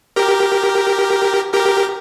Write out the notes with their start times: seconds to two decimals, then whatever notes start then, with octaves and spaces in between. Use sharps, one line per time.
0.16 G4 A#4
1.54 G4 A#4